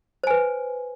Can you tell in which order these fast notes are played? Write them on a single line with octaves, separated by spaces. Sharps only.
C5 G#5 B4